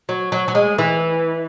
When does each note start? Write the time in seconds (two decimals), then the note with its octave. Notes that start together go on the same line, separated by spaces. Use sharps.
0.09 F#3
0.32 F#3
0.48 F#3
0.55 G#3
0.78 E3